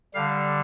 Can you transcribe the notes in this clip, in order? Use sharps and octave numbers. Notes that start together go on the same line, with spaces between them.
D3 G3 F5